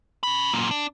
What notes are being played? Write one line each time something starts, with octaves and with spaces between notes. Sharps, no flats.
C#4 B5
F#2 A#2
D4